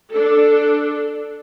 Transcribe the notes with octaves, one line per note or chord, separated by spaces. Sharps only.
D4 A4